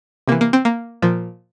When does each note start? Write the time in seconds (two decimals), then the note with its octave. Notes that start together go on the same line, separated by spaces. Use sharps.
0.28 C3 E3 A#3
0.41 A#3
0.53 C4
0.65 A#3
1.02 A#2 F3